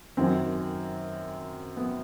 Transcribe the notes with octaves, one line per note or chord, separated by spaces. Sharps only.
F#2 D#3 F#3 C4
B3